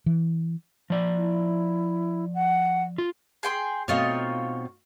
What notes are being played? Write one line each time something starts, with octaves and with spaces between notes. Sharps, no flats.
E3
F3 D5
E4
F#5
F4
G#4 G5 C6
B2 A3 C4 D#4 F4 C#5